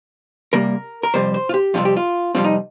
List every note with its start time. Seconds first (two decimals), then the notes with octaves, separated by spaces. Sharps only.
0.53 C3 G3 A#3 A#4
1.03 A#4
1.14 F2 C3 G3 C4 C5
1.34 C5
1.49 F4
1.54 G4
1.74 F2 C3 G3 C4 F4
1.85 G4
1.97 F4
2.35 F2 C3 G3 C4 F4
2.44 D#4